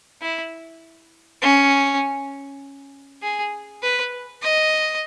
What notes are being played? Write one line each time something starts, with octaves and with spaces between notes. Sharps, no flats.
E4
C#4
G#4
B4
D#5